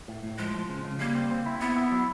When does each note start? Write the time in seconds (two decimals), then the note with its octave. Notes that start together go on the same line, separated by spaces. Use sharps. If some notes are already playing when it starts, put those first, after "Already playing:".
0.08 A2
0.23 A2
0.38 F3 G#3
0.54 F3
0.69 C#3
0.85 C#3
1.00 G3 A#3
1.15 C4
1.31 C4
1.46 E4
1.61 B3 E4
1.76 E4
1.92 F#3